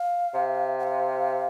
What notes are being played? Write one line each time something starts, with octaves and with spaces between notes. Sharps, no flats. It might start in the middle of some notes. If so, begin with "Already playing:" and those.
Already playing: F5
C3
F#5
F5